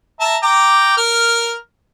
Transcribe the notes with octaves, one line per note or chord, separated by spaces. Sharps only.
E5 A5 A#5
G5 A#5 D6
A#4 F6